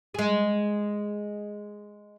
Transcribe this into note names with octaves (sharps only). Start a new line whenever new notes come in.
G#3 G#4